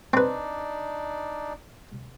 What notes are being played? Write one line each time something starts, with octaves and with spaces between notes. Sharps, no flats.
C4 D4 D#4 B4 D5